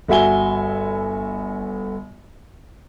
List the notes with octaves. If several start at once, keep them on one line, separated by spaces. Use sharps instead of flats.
G1 F#4 E5 G#5 G7